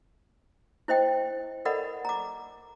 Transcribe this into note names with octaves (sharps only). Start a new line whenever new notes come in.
E4 C5 D#5 G5
A4 A#4 D5 D#5 F#5 B5
A#5 D6